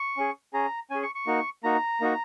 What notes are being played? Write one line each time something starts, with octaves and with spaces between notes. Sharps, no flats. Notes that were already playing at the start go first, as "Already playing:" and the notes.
Already playing: C#6
C#4 G#4
C#4 G#4 A#5
C#4 G#4 G#5
C#6
C#6
A#3 D#4 F#4
A#3 D#4 F#4 A#5
A#3 D#4 F#4